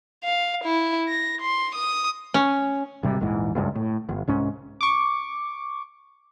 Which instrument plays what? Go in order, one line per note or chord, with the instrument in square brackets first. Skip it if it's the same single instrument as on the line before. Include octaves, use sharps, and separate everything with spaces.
[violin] F5
E4
A#6
C6
D#6
[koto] C#4
[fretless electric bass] G#1 C3 G3
A#1 E2 G#2 E3
F#1 C#2 G2
A2
G1
C2 G#2 C#4
[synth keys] C#6 D6